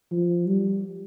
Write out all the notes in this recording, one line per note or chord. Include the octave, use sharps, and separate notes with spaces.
F3
G3